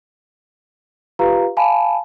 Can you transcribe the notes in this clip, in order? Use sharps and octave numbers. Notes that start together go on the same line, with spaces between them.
F4 G4 B4 F5 A#5
F5 G#5 A5 B5